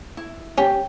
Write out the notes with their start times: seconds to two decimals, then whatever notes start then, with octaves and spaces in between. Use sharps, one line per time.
0.17 E4
0.58 C#4 G4